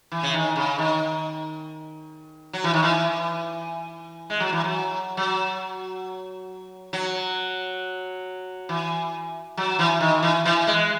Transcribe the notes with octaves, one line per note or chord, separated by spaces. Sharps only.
E3
C#3
D#3
C#3
D#3
F#3
E3
D#3
E3
G#3
F#3
E3
F#3
F#3
F#3
E3
F#3
E3
D#3
E3
E3
G#3